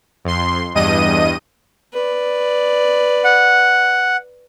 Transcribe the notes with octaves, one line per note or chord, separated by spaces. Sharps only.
F2 C6
E2 G2 D#5 D#7
B4 D5
F#5